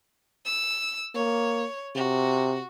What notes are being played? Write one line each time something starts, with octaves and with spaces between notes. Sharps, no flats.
E6
A#3 C#5
C3 F#4